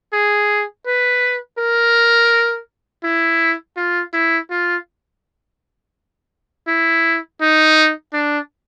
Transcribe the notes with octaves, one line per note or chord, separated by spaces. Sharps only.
G#4
B4
A#4
E4
F4
E4
F4
E4
D#4
D4